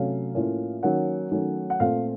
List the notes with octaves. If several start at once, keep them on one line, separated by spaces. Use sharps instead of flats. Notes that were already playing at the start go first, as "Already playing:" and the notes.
Already playing: C3 F#3 A3 C#4 F5
A2 F3 A#3 C#4
D#3 F#3 A#3 C#4 F#5
D#3 F#3 A3 C#4
F#5
A#2 A3 C4 F5